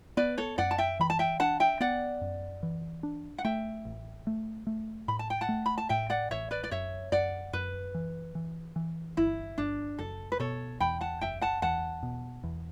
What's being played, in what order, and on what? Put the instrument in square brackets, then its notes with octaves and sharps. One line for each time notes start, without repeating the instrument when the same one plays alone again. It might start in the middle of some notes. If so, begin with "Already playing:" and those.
[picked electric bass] B3 [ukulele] B4 D5
[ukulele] A4 C#5
[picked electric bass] F#2 [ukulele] D5 F#5
[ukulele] A5
E5 G5
[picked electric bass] E3 [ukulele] B5
[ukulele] A5
E5 G5
[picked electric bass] D4 [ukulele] F#5 A5
[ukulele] E5 G5
[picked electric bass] B3 [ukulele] D5 F#5
[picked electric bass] F#2
E3
D4
[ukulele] F#5
[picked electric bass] A3 [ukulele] E5 G5
[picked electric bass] A1
A3
A3
[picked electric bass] A2 [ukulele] B5
[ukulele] A5
G5
F#5 A5
[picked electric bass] A3
[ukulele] B5
A5
[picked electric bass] A2 [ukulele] E5 G5
[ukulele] D5 F#5
[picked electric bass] A1 [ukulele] C#5 E5
[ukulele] B4 D5
D5
[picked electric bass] F#2 [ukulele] C#5 E5
[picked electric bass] F#2 [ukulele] D5 F#5
[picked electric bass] F#2 [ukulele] B4
[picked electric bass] E3
E3
E3
[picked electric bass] G1 [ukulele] E4
[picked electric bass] G1 [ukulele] D4
[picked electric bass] F#1 [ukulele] A4
[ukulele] B4
[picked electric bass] B2 [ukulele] A4 C#5
[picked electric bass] E2 [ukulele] G5 B5
[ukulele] F#5 A5
[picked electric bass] F#1 [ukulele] E5 G5
[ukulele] F#5 A5
[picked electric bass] E2 [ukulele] F#5 A5
[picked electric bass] B2
E2